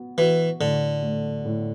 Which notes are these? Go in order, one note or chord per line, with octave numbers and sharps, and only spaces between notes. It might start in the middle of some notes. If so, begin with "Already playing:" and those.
Already playing: B3 F#4
E3 F#4
A2 D3
A3
A2